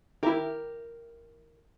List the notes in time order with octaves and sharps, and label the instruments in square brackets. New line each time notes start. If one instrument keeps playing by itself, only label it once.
[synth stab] D#3 E4 [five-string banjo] G4 A#4